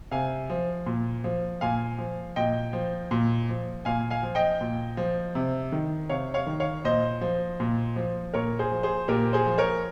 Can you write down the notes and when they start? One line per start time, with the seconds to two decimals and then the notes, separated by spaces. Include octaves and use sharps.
0.11 C3 F5 G#5
0.50 F3
0.86 A#2
1.24 F3
1.61 A#2 F5 G#5
1.98 F3
2.36 A#2 D#5 G5
2.73 F3
3.11 A#2
3.49 F3
3.85 A#2 F5 G#5
4.10 F5 G#5
4.23 F3
4.35 D#5 G5
4.61 A#2
4.97 F3
5.35 C3
5.72 D#3
6.09 C3 C#5 F5
6.34 C#5 F5
6.47 D#3
6.60 C#5 F5
6.84 A#2 C5 D#5
7.21 F3
7.60 A#2
7.96 F3
8.34 A#2 A#4 C#5
8.59 G#4 C5
8.72 F3
8.83 G#4 C5
9.08 A#2 G4 A#4
9.33 G#4 C5
9.46 F3
9.58 A#4 C#5